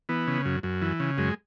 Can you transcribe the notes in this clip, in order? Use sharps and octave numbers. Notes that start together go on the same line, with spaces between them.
E3 B3
C#3
F#2
F#2
E3
C#3
F#2 G#3